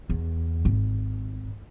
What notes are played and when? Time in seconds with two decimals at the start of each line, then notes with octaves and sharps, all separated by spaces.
0.10 E2
0.65 G#1